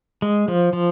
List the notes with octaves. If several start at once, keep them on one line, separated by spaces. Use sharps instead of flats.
G#3
F3
F3